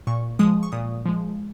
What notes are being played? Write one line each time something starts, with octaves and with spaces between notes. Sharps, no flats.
A#2 C#6
F3 G#3 D#6
C#6
A#2 D#6
F3 G#3